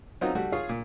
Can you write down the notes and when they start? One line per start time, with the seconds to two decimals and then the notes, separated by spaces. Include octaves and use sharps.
0.21 F#3 C4 C#4 D#4 F4 F#4
0.35 G3 A3 F#4
0.52 F4 G#4 C#5 F5
0.69 A#2